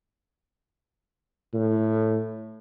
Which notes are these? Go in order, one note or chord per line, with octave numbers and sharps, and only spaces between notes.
A2